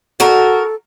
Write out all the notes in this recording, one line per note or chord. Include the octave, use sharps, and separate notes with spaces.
F#4 A4 A#4